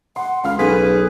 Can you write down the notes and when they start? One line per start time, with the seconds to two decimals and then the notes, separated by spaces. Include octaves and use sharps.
0.16 F#5 C6
0.44 C#2 F5 B5 C6 F6
0.59 B1 C#4 G#4 A4 B4 B6